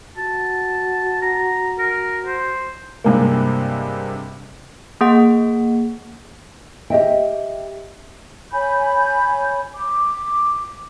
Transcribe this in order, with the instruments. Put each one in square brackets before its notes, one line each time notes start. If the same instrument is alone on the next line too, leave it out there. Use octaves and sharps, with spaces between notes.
[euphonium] F#4 [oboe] A5
[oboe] A#5
A#4
C5
[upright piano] G2 C3 G#3 A#3
[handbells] A#3 G#4 F#5
[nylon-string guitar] G4 D#5 E5 G5
[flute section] C#5 G#5 B5 G6
D6